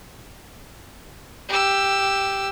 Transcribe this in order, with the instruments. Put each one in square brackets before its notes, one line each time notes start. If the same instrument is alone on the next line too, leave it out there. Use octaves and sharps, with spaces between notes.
[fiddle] G4 E6